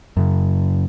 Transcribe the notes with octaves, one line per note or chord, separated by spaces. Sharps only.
F#2 C#3